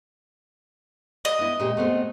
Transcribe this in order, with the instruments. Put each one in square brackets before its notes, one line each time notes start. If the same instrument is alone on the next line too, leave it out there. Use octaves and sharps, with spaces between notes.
[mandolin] D#5
[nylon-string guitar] B3 E4
A#2 G#3 G4
A3 B3 C4